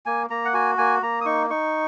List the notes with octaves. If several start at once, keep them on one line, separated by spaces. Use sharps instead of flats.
A#3 G#5
A#3 A#5
F#5
F#4 G#5
A#3 G#5
A#3 A#5
D#6
D#4 C#6
D#4 C#6